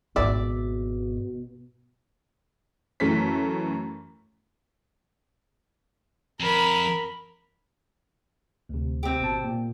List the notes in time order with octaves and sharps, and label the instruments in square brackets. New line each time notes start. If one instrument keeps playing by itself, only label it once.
[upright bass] G#1 G#2 [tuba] B2 [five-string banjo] D5 E5
[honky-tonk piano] F#2 E3 A3 B6
[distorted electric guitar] F2 [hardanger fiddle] A#4 B5
[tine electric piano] D2 C3
[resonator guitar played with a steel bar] C4 G4
[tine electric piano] G#1 B2 A5
A#2